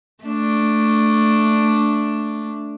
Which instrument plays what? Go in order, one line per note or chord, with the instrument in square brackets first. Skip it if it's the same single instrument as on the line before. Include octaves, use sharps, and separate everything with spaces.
[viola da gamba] A3 D4